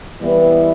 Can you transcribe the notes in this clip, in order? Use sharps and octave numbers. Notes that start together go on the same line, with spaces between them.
E3 G3 B3 E4 B4